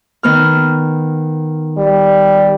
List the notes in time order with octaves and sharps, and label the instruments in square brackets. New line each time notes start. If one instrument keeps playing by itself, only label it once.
[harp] D#3 B3 F6
[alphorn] G3